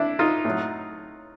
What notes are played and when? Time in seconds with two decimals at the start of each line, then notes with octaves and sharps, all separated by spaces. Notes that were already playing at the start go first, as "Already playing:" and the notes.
Already playing: D4 E4
0.19 D#4 F4
0.45 A2 F#3